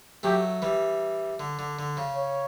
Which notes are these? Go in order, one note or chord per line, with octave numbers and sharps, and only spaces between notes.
F#3 A3 G4
E3 G3
D3
D3
D3
C#3
C#5